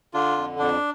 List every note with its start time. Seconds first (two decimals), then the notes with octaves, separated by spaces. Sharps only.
0.14 D3 D4 F4
0.37 F2
0.59 F2 D4